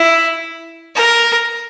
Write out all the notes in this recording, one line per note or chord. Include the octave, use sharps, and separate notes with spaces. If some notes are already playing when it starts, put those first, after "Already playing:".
Already playing: E4
A#4